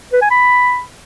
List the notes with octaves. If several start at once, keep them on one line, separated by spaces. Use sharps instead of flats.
B4
G#5
B5